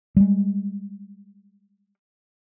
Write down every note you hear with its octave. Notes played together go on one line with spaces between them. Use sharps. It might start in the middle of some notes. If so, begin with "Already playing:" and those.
G3 G#3